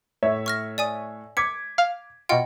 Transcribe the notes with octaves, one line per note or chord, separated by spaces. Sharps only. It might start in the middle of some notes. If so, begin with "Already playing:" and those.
A2 C#5 E5
C#6 F6 A#6
D5 G#5 D#6
D6 G#6 B6 C#7
F5
B2 F4 D#5 F#5 G5